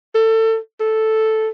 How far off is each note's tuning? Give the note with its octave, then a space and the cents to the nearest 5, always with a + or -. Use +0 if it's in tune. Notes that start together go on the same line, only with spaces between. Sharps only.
A4 +25
A4 +0